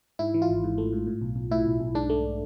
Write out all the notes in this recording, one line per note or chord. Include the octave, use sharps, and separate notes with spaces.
G#2 E4
E3
F4
G#1
G#2
A3
G#2
A2
B1
B1
A2 E4
B1
B1
G#2 D4
A3